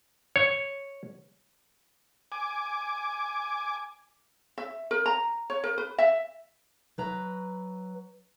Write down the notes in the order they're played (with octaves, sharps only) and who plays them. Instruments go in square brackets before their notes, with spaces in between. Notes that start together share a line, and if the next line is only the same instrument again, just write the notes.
[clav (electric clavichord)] C#5
[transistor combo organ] G#5 D6
[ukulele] E5
A#4
A#5
C#5
A#4
B4
E5
[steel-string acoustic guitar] F#3 B4 A#5